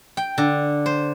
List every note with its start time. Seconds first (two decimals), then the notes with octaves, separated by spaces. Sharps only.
0.17 G5
0.38 D3
0.86 C5